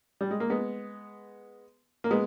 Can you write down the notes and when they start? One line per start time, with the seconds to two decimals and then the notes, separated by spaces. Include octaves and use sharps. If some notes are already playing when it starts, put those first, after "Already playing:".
0.21 G3
0.31 G#3
0.40 A#3
0.50 G#3 B3
2.04 A#3
2.11 G#3 B3